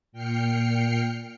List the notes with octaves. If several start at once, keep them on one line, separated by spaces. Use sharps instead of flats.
A#2 G5 F6 C7 C#7